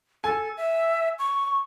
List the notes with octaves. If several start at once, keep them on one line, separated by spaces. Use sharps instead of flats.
A4 G#5
E5
C#6